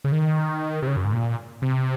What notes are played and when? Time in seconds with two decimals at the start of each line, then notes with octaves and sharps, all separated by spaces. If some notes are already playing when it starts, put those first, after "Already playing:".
0.04 C#3
0.12 D#3
0.82 C3
0.87 C#3
0.97 F#2
1.05 G#2
1.13 A#2
1.62 C3